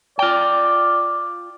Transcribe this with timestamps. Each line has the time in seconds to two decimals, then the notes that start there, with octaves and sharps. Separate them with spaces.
0.19 F4 D5 G5